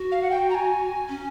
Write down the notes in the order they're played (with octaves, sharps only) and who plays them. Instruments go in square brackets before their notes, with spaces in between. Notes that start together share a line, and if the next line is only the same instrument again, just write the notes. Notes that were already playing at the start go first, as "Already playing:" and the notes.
Already playing: [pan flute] F#4
[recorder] F5
F#5
G5
A#5
G#5
[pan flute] C#4